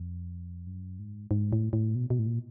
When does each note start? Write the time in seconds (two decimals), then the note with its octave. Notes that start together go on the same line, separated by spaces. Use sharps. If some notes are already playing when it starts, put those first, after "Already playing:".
Already playing: F2
0.67 F#2
0.99 G#2
1.31 G#2
1.53 A2
1.73 A2
1.95 B2
2.10 B2
2.19 A2
2.27 A#2